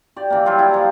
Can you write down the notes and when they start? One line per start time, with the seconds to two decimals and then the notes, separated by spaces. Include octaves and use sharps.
0.16 G4 D5
0.30 E3 A#3
0.46 F#3 G3 F4 G4
0.59 E4
0.74 F3